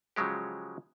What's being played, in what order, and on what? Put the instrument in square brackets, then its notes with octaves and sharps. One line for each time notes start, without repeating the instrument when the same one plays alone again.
[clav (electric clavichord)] C#3 F3 F#3 G#3 G4